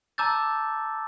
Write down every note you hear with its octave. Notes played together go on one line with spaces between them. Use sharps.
A5 A#5 D6 E6 G6 A6